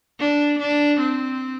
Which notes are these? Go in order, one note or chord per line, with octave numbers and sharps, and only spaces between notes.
D4
D4
C4